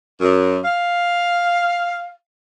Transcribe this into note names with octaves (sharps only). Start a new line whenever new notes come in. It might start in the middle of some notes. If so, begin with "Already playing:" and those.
F#2
F5